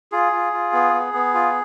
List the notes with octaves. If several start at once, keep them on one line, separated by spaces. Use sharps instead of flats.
F4 G#4
F4
F4
B3
B3
B3
F4